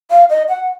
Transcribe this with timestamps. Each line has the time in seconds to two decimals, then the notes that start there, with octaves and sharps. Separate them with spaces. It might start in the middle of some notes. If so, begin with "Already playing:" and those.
0.11 F5
0.30 D#5
0.49 F#5